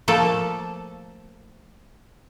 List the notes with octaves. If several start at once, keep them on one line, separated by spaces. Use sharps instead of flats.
F3 A3 A#3 A4